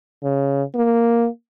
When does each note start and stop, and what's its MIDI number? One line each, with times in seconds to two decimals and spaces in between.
0.23 0.63 49
0.75 1.27 58